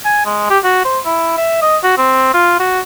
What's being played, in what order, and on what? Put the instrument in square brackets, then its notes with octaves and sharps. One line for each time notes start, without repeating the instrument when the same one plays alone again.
[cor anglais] G#5
G#3
G4
F#4
C5
E4
E5
D#5
F#4
C4
F4
F#4